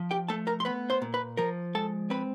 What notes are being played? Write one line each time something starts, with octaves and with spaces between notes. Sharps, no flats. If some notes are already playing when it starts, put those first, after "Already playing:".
Already playing: F3
G4 G5
A3 A4 A5
A#4 A#5
C6
B3 B4 B5
C5 C6
A#2
B4 B5
F3 A#4 A#5
G#3 A4 A5
C4 B4 B5